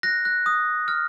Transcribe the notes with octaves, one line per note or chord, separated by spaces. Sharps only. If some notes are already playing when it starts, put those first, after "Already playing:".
F#6 A#6
F#6
D#6
F6